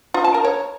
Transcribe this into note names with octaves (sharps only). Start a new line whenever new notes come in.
F4
A5
A#4
C#5